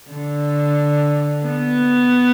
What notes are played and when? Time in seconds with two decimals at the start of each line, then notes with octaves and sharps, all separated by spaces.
0.10 D3
1.46 B3